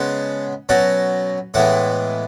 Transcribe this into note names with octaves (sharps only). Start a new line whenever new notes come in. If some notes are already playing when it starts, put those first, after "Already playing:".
Already playing: C#3 G#3 B3 F#5 A5
B2 F#3 C#4 F#5 A5
A2 E3 G#3 B3 F#5 A5